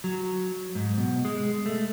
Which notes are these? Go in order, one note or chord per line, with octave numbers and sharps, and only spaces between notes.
F#3
G#2
B2
G#3
A3